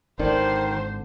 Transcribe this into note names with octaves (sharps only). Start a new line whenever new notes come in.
G#1 D3 D#3 D4 C5